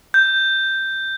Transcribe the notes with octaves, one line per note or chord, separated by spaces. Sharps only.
G6